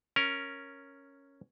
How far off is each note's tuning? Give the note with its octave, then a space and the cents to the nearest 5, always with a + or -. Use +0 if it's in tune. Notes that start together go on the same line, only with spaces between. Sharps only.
C#4 +0 A#4 +0